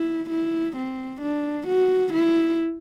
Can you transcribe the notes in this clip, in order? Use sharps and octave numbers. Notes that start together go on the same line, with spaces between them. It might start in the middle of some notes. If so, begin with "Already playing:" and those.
Already playing: E4
E4
C4
D4
F#4
E4